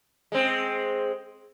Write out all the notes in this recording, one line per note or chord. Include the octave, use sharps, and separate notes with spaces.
G#3 C4